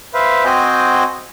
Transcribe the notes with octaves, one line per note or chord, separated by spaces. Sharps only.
B4 C5 E5 F5
C4 F#4 C5 D#5 G5 G#5